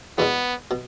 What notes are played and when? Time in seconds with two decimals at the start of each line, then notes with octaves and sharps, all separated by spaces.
0.18 E2 B2 G#3 B3
0.71 B2